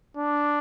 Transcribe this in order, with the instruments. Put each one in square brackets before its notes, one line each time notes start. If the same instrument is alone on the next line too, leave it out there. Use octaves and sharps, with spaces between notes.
[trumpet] D4